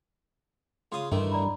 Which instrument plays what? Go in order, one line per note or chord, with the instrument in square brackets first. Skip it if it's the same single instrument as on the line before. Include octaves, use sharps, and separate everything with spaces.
[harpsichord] C#3 F4 D#6 [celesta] C6
[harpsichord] A1 D#3 A3 [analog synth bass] G2
[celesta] D5 A#5 B5